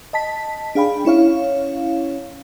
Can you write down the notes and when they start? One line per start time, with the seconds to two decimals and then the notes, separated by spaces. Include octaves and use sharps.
0.13 D#5 A5 B6
0.75 D4 G#4 F5 G5 B5
1.05 C#4 E4 C#5 F5